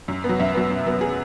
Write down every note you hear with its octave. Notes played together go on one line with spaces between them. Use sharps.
F#2
B3
F#3
F#2 E5
F#3 B3
F#2
F#3 B3
G#4